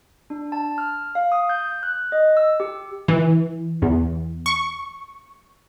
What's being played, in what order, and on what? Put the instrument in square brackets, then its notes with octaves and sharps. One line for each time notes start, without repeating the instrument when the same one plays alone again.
[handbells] D4
A5
F6
F5
D#6
G6
F#6
D#5
E6
G4
[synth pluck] E3
E2
C#6